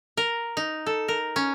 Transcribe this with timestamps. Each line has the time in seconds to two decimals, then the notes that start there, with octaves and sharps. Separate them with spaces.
0.17 A#4
0.57 D#4
0.86 A4
1.08 A#4
1.36 C#4